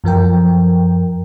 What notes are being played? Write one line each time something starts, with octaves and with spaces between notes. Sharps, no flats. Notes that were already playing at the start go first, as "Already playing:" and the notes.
F#2 F3 A#4 G5